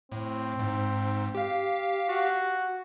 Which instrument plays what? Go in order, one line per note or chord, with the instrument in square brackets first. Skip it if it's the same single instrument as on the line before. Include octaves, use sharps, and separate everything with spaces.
[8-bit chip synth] A2 [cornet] C4
[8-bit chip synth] G#2
G4 F5
[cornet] F#4